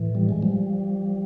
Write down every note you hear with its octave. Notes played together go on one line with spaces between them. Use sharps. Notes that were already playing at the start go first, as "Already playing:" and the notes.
Already playing: A2 E3
G3
G#3
F3 G3